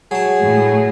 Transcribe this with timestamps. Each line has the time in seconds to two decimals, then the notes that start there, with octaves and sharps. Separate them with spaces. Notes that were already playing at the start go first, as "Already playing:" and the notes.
0.11 F#3 G#4 A5
0.40 A2